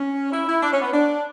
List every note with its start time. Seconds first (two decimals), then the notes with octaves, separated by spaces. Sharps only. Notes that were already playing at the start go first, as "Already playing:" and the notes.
Already playing: C#4
0.32 E4
0.47 E4
0.63 D4
0.72 C#4
0.82 B3
0.92 D4